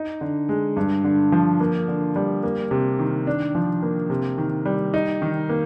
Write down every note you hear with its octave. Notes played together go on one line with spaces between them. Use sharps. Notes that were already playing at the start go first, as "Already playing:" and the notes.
Already playing: D#4
D3
G#3
G2
D3
F3
A#3
D3
G3
A#3
C3
D#3
D4
F3
A#3
C3
D#3
G3
D#4
D#3
A#3